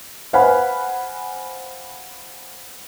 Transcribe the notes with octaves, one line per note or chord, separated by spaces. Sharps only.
B4 C5 F5 F#5 G#5 B5